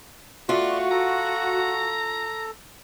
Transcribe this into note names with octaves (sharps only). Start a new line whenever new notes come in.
A3 F4 F#4 D5 C6
A4 A#5